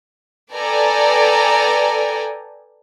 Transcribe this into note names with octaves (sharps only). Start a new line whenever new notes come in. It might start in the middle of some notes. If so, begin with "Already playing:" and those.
A4 B4 D5 G5 G#5 A#5